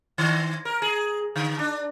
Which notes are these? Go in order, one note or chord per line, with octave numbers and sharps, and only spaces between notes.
D#3
A#4
G#4
D3
D4